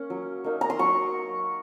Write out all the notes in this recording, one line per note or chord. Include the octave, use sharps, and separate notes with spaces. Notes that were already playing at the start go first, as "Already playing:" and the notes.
Already playing: A#3 C#4
F#3
A#3 D#4
A#5
C6
F#3 C#6